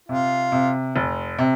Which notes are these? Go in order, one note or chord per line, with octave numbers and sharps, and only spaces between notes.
C3 F4
C3
F1
C3